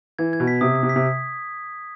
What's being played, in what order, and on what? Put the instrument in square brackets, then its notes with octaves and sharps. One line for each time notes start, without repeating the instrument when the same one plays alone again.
[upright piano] E3 [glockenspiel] G#6
[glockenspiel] G#6
[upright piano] B2
[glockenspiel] B6
[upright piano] C3 [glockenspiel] D#6
[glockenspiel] B6
[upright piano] C3
[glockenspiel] B6
[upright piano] C3